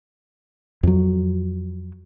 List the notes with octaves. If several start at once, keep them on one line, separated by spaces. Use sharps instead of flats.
F2 F#3